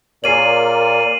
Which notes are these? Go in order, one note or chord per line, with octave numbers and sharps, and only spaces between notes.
A#2 G#4 A#4 C#5 D5 C7 D#7 F#7